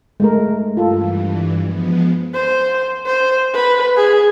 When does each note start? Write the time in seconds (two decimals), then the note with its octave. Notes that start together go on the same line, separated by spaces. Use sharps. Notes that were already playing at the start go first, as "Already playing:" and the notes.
0.20 G#3 A3 A#4
0.77 G2 E3 F4 A4
1.60 F3 G#3 B3
2.34 C5
3.06 C5
3.55 B4
3.97 G#4